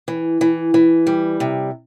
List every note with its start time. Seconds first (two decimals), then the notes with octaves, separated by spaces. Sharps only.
0.08 E3
0.41 E3
0.74 E3
1.07 G3
1.40 C3